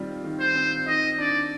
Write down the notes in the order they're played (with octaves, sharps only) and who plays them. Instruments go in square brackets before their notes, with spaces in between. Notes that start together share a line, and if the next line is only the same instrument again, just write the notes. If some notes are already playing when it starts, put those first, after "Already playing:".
Already playing: [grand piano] D#3 G3 C4 F4
D#3
[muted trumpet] C5
[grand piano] C4
[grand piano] D#3 [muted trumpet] D#5
[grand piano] D4 [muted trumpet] D5